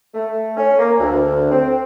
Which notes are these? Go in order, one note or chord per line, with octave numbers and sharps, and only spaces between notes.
A3
C#4
A#3
D2
C4